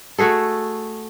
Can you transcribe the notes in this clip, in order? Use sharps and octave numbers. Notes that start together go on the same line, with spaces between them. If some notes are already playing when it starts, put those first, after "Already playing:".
A3 F#4 G#4 A4